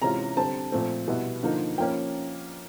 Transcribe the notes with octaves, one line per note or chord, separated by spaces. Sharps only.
C3 E3 G#3 C#4 F4 A#5
D3 G3 C4 A5
A#2 F3 A3 C4
B2 G3 B3 E4
D3 F3 A#3 D#4
F3 A#3 C#4 G5